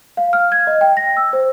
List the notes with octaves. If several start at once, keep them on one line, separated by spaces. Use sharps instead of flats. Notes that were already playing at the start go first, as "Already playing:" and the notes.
F5
F6
G#6
D#5
G5
A#6
E6
C5